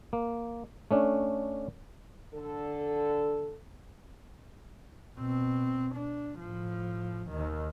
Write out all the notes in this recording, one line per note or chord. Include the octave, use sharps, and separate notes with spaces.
A#3
A3 C#4 D4
D3 A4
B2 C4
D4
A2 F3
D#2 D#3